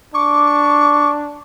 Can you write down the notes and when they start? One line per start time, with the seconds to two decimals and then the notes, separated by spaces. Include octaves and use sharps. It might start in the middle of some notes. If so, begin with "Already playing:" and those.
0.14 D4 C#6 D6